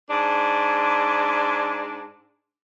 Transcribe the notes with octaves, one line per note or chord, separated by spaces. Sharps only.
G#2 D4